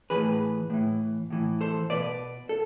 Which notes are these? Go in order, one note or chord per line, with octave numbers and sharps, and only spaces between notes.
A2 E3 G#4 B4
A2 E3
A2 E3
A4 C5
B2 B4 D5
A4